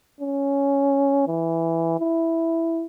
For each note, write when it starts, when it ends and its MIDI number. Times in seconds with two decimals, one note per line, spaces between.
0.21 1.27 61
1.27 2.00 52
2.00 2.86 64